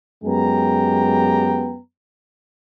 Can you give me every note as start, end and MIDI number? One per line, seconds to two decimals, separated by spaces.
0.25 1.77 42
0.25 1.77 56
0.25 1.77 59
0.25 1.77 67
0.25 1.77 79
0.25 1.77 82